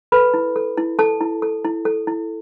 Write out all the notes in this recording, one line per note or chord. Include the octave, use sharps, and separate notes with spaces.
A4 B4 B5
E4
A4
E4
A4 A5
E4
A4
E4
A4
E4